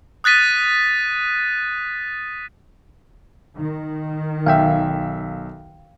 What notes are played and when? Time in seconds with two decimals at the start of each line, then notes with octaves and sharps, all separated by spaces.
0.24 D#6 F#6 A6 B6 D#7
3.59 D#3
4.46 B1 E5 F5 G5